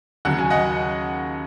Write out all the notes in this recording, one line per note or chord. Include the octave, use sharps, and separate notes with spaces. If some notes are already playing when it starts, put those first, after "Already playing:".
D#2 C#3 F#3 F#5
G#5
D#5 F#5